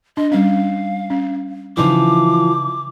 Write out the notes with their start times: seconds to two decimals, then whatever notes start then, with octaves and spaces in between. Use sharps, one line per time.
0.17 D4 D#5
0.32 G3 C#4 F5
1.10 C#4
1.77 C#3 E3 F3 D#4 E4 D6